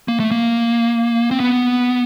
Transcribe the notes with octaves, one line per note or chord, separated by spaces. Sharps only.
A#3
A3
A#3
C4
B3